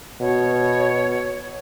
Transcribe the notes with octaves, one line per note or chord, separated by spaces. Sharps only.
B2 C#5